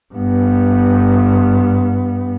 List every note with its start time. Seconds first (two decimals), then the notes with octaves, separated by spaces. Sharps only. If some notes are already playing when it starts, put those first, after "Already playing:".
0.14 G2 B3